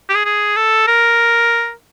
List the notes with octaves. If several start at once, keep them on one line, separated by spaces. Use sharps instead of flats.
G4
G#4
G#4
A4
A#4